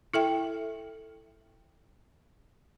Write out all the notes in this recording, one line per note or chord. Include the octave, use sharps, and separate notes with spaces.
E4 A4 E5 G5